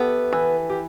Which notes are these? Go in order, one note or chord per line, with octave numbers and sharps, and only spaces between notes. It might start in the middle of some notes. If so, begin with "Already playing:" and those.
Already playing: B3 G4 A4 E5
E3 B4
G4